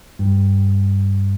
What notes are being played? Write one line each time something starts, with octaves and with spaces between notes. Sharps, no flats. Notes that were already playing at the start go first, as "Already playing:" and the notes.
G2